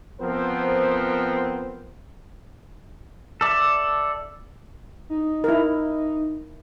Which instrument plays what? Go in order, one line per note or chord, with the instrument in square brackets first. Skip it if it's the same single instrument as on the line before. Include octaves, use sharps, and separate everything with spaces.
[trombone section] F3 B3 C4 A#4 C5
[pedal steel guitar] A4 D5 E5
[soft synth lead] D#4
[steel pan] E4 A#4